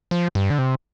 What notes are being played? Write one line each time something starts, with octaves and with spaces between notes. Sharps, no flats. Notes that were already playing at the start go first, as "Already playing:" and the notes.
F3
G2
D3
C3